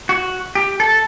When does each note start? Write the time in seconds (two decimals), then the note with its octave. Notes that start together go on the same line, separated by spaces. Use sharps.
0.09 F#4
0.55 G4
0.80 A4